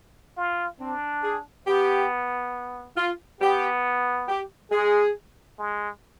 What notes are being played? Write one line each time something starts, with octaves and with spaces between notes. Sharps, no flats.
F4
C4 D4
G#4
B3 G4
F4
B3 G4
G4
G#3 G#4
G#3